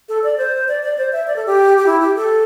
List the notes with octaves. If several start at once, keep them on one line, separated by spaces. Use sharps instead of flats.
A4
D5
C5
D5
D5
C5
E5
D5
A4
G4
G4
E4
G4
A4